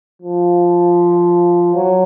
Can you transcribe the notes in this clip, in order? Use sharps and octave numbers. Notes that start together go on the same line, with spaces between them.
F3
F#3